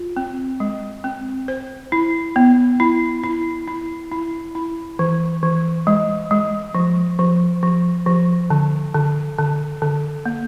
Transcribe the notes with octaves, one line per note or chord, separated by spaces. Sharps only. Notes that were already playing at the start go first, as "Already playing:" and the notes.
Already playing: F4
C4
G#3
C4
C5
E4
B3
E4
E4
E4
E4
E4
E3
E3
G#3
G#3
F3
F3
F3
F3
D3
D3
D3
D3
A#3